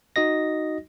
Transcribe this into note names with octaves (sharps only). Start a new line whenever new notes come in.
D#4 F#4 D#5 A#6